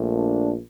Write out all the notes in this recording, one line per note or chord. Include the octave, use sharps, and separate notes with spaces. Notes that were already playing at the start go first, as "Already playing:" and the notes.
Already playing: A#1 A#2 A3
D4